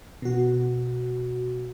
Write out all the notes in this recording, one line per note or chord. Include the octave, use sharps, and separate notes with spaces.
B2 F#4